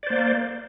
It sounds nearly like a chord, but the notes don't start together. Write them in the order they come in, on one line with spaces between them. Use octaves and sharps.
D5 C5 A#3